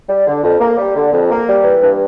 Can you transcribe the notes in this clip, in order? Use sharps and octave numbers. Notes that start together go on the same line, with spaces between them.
G3
D3
F2
A#3
G3
D3
F2
A#3
G3
E3
G2